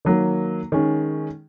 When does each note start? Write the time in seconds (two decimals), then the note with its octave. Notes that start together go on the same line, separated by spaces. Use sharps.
0.05 D#3 F#3 A#3
0.72 D#3 G#3 C#4